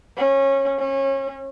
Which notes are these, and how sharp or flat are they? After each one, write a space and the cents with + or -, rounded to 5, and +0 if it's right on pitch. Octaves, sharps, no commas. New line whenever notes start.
C#4 -20
C#4 -30